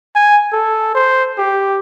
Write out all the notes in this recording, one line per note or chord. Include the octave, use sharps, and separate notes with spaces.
G#5
A4
C5
G4